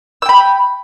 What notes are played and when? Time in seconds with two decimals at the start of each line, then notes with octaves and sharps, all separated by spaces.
0.22 E6
0.26 G5
0.29 B5